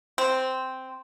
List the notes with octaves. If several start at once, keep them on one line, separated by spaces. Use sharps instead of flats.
C4